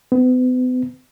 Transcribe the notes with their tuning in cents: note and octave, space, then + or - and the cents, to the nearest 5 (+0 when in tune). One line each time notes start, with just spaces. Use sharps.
B3 +40